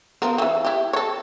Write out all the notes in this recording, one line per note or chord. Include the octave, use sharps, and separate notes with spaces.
F3 B3 A#4
D#3 E3
E4 G4
A4 C#5